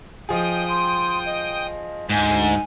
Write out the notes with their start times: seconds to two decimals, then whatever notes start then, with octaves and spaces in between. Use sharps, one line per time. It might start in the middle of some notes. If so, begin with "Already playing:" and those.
0.29 F3 G#4 D#5 G5 D#6
0.67 C6
1.25 D#5
2.09 D2 G#2 G#5